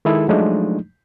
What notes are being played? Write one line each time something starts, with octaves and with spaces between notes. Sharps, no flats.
D#3 G#3 E4 G#4 A4
F3 F#3 G#3 A3 D4 D#4